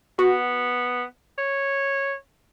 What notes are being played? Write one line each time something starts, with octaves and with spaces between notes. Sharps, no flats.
B3 F#4
C#5